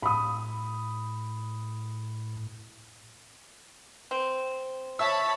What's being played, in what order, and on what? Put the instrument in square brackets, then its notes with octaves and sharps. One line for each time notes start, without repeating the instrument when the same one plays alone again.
[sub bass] A2 [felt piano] B5 D#6
[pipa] C4
[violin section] C#5 A5 B5 [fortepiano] E5 E6 [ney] C#6